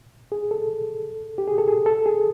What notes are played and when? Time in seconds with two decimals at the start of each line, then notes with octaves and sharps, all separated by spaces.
0.32 G#4
0.51 A4
1.38 G4
1.48 G#4
1.58 A4
1.68 G#4
1.86 A4
2.06 G#4